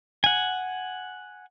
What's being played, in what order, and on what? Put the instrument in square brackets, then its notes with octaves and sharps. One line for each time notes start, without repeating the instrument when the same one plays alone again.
[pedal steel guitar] F#5 G#5